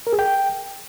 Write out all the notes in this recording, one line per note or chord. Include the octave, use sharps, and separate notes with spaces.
A#4
G#4
G5